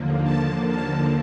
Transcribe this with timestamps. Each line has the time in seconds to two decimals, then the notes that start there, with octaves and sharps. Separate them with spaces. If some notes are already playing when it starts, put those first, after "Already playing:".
Already playing: D#2 D3 F3 A#3
0.24 A5
0.69 A5